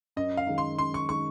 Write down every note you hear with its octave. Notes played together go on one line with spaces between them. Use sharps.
F#2 D#5
F5
D#3 G#3 D#4
C6
F#2 C6
C#6
D#3 G#3 D#4 C#6